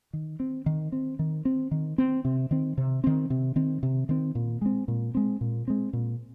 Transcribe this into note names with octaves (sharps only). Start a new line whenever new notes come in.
D#3
C4
D#3
C4
D#3
C4
D#3
C4
C3
D#3 C4
C3
D#3 C4
C3
D#3 C4
C3
D#3 C4
A#2
G#3 C4
A#2
G#3 C4
A#2
G#3 C4
A#2